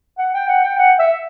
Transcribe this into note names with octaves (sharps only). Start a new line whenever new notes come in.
F#5
G5
F#5
G5
F#5
E5